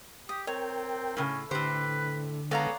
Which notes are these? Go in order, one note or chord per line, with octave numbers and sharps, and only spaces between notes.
G4 D#6
C4 A#4 C#5 G5
A2 C#3 C#4
A2 D3 G4 B4 C5
G#3 B3 A4 C#5 D5 F5 A#5